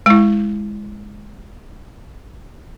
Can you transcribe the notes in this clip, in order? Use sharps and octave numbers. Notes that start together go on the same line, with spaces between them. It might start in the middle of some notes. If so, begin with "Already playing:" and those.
G#3 E4